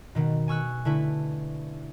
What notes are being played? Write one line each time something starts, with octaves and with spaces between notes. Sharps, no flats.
B2 D#3 B3
G#5 C#6 E6 F#6
D3 A3 E4 B4